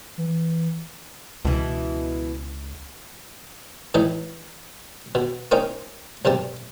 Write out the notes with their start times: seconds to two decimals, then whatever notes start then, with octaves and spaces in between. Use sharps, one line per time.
0.18 E3
1.45 C#2 B2 E3
3.94 A2 E3 D#4
5.15 B2
5.51 A#3 C4 C#4 D#4
6.25 B1 G2 C3 A5